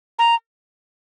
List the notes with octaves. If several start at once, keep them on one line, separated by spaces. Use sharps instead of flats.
A#5